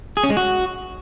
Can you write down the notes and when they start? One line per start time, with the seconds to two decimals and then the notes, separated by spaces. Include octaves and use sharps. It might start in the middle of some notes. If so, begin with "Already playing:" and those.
0.17 G#4
0.23 C#4
0.30 G#3
0.37 F#4